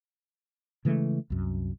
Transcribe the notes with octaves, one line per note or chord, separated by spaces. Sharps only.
C#3 E3 G#3 A3
C2 F#2